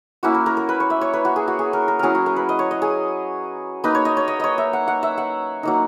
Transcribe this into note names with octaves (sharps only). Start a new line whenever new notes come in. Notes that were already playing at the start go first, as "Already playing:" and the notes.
A#3 C#4 E4 F#4
A#4
A#4
A#4
B4
C#5
E5
C#5
B4
F#4
G#4
F#4
G#4
A#4
A#4
F#3 C#4 E4 G#4 A#4
F#4
A#4
B4
D#5
C#5
D#5
G#4
A#3 D#4 B4
C#5
D#5
C#5
D#5
C#5 D#5
E5
F#5
F#5
E5
F#5
F#3 A#3 D#4